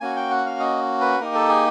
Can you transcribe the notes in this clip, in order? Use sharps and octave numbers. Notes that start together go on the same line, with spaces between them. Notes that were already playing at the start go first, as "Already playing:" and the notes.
A#3 C#4 F#4 G#5
G5
F#5
F5
D#5
B4
A#3 D#4 G4 A#4
A4
G#4